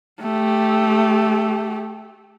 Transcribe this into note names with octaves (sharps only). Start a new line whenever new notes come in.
A3 G4